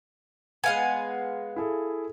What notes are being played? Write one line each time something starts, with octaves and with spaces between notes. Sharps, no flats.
G#3 B3 F5 G#5
E4 G#4 A4